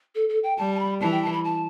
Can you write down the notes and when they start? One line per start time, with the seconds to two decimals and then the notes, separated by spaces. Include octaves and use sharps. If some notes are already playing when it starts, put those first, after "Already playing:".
0.15 A4
0.29 A4
0.43 G5
0.58 G3 A5
0.75 A5
0.79 B5
1.01 E3 A5
1.12 G5
1.23 A5
1.33 B5
1.44 A5